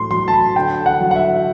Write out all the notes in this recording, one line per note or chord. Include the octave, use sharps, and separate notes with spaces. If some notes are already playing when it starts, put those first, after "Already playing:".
Already playing: A2 F#3 C6
F#3 C6
A5
B5
D3 G5
F#5
F#3
F#5
E5